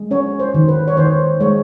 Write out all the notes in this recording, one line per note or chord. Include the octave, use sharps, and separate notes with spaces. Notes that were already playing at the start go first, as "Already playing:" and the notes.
Already playing: G#3
C#4 C#5
C5
D#3
B4
C#5
D#3 C5
G#3 C#5